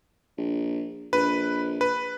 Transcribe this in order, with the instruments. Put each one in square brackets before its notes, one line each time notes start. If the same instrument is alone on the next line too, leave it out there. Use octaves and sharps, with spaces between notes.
[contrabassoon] A#1
[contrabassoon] A#1 [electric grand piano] B4
[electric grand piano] B4